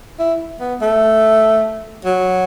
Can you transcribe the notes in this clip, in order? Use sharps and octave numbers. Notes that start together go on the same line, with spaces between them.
E4
B3
A3
F#3